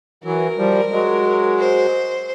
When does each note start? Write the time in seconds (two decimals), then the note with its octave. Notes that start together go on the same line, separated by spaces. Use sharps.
0.24 E3 F#3 A#4
0.57 F3 G3
0.92 F#3 G#3
1.59 C5